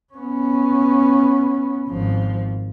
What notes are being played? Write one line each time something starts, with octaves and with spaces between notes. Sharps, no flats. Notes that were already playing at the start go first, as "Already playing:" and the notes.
B3 C#4
G#1 F3